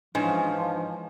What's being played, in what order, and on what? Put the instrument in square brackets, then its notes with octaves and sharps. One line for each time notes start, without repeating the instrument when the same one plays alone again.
[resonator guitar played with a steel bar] G#2 [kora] E3 G#3 C#4 [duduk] F3 [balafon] D4